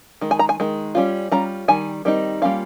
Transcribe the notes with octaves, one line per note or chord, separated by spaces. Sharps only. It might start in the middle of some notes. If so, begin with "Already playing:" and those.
D#3 G#3
G#5
A#5
G#5
D#3 G#3
G3 C#4 F4
G3 C#4 F4 A#5
D#3 G3 G#5
D#3 G3 C4 D#4
G3 A#3 C#4 F4 F5